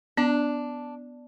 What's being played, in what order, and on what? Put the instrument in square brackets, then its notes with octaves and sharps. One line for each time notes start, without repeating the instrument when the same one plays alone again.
[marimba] B3 [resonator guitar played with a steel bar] D4